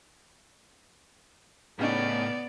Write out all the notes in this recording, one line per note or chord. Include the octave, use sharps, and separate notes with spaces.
A2 C#3 B3 C#4 D#4 D5